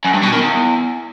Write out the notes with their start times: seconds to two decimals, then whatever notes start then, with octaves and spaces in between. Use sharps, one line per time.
0.04 F#2
0.14 G2
0.23 B2
0.33 D#3
0.42 E2